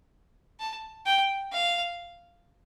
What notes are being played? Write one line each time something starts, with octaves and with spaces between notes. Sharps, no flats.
A5
G5
F5